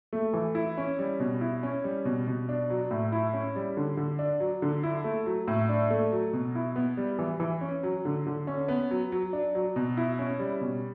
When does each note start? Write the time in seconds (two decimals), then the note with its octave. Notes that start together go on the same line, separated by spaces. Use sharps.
0.13 A3
0.33 E3
0.55 E4
0.77 C#4
0.99 G3
1.20 B2
1.41 E4
1.63 C#4
1.84 G3
2.05 B2
2.27 B2
2.49 D4
2.70 F#3
2.91 A2
3.12 E4
3.33 C#4
3.56 G3
3.77 D3
3.97 D3
4.19 D4
4.40 F#3
4.62 D3
4.83 E4
5.04 A3
5.26 F#3
5.48 A2
5.69 D4
5.90 A3
6.12 F#3
6.33 B2
6.55 E4
6.76 B3
6.97 G3
7.19 E3
7.40 E3
7.61 C#4
7.83 F#3
8.05 D3
8.27 D3
8.47 C#4
8.68 B3
8.91 F#3
9.12 F#3
9.33 D4
9.55 F#3
9.76 B2
9.97 E4
10.19 C#4
10.39 G3
10.61 B2